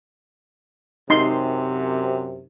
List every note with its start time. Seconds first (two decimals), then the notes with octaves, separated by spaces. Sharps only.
1.10 F#2 C3 D#4 C6